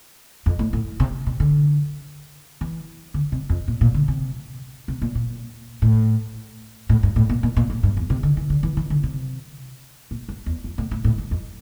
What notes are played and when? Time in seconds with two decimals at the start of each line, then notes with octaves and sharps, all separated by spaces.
0.46 F2
0.59 A2
0.73 A2
1.00 C3
1.27 C3
1.40 D3
2.61 E3
3.14 D3
3.32 C3
3.49 F2
3.68 A#2
3.81 A#2
3.94 D3
4.08 C3
4.88 C3
5.02 A#2
5.15 A#2
5.82 A2
6.89 A2
7.03 G2
7.16 A2
7.29 A#2
7.43 A#2
7.56 A#2
7.70 A2
7.83 G2
7.97 E2
8.10 C3
8.23 D3
8.37 E3
8.50 D3
8.63 E3
8.77 E3
8.90 D3
9.03 C3
10.11 A#2
10.29 G2
10.46 E2
10.64 F2
10.78 A2
10.91 A2
11.04 A2
11.18 G2
11.31 F2